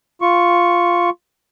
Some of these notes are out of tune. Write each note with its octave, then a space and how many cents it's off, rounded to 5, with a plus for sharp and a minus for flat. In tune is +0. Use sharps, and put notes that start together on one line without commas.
F4 +0 C#6 +0